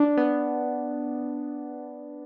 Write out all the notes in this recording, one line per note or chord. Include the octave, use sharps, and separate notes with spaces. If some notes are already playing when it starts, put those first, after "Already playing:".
Already playing: D4
B3